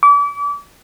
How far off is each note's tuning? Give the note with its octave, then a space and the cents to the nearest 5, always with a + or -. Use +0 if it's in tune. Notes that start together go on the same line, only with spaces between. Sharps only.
D6 -35